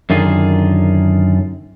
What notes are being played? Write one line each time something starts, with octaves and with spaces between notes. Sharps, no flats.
F#2 D3 D#3 F4 G#4